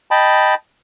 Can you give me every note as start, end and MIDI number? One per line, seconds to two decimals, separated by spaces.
0.11 0.54 75
0.11 0.54 79
0.11 0.54 81
0.11 0.54 83